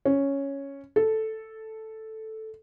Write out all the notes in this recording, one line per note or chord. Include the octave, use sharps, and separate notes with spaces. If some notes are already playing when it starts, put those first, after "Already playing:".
C#4
A4